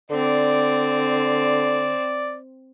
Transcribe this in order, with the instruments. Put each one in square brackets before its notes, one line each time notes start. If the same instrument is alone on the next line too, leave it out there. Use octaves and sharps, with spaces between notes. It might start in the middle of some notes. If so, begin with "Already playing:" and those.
[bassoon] D3 [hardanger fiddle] C4 [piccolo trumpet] D5